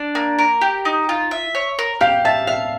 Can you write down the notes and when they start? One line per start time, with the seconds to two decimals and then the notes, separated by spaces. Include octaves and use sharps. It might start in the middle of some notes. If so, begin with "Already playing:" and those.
Already playing: D4
0.15 A#3
0.39 A#4
0.61 G4
0.85 D#4
1.09 F4
1.31 E5
1.55 C#5
1.79 A#4
2.01 G4 F5
2.25 E5 A5
2.47 E5 F5